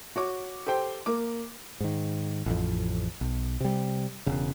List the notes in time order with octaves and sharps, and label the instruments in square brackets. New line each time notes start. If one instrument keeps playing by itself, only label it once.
[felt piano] F#4 C#5 D6
G4 A4 C5 G5
A#3 A#4 D6
[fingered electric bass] G#2 D#3
A1 F2
B1
C3 G3
E1 C#3